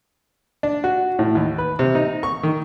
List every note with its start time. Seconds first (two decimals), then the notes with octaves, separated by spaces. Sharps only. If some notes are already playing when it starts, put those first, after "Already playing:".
0.63 D4
0.84 F#4
1.19 A2
1.35 D#2
1.58 B4
1.79 C3
1.95 D#4
2.23 C#6
2.43 D#3